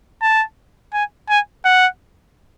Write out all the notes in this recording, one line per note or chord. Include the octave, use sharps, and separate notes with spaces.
A5
G#5
G#5
F#5